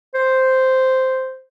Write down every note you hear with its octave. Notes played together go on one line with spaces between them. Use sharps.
C5